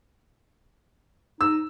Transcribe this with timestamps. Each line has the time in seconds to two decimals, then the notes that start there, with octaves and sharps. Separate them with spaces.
1.41 D#4 E6